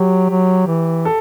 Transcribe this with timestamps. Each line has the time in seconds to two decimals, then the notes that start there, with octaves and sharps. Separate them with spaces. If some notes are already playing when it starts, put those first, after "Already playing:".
Already playing: F#3 G4
0.30 F#3
0.67 E3
1.05 A4